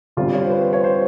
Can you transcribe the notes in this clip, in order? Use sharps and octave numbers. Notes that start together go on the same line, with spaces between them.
D3 G3 C4 F4
C#5
C5
B4
C5
C#5
C5